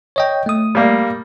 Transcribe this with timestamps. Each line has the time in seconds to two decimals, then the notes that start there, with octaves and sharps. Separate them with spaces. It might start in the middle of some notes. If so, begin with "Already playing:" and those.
0.16 C#5 D#5 G5
0.46 A3 D#6
0.75 G3 A#3